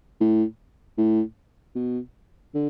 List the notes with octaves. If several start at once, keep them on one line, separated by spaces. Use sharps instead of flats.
A2
A2
B2
D3